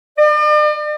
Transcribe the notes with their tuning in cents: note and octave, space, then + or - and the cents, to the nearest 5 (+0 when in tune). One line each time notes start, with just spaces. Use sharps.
D5 +45